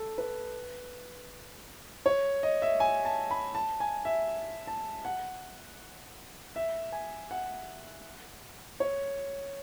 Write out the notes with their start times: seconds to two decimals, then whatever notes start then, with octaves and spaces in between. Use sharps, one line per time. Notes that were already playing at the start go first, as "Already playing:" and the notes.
Already playing: A4
0.18 B4
2.06 C#5
2.43 D#5
2.62 E5
2.80 G#5
3.05 A5
3.31 B5
3.55 A5
3.80 G#5
4.05 E5
4.67 A5
5.05 F#5
6.56 E5
6.92 G#5
7.31 F#5
8.80 C#5